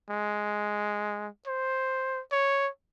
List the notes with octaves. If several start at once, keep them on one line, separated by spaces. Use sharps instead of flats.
G#3
C5
C#5